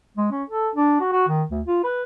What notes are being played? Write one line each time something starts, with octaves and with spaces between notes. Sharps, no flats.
G#3
C#4
A4
D4
F#4
F#4
D#3
D2
F4
B4